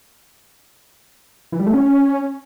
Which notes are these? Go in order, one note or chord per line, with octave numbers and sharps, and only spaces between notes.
E3
G3
A3
C#4